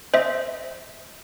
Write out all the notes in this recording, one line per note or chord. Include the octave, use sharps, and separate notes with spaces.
C5 D#5 E5